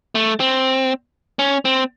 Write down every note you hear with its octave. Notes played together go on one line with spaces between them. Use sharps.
A3
C4
C#4
C4